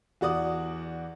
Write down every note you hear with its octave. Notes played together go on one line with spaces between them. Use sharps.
E2 F#4 D5 D#6